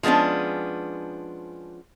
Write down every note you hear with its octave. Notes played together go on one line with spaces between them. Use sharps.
F3 G#3 B3 C#4 D4